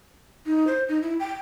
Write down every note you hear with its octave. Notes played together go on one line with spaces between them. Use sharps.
D#4
C5
D#4
E4
G5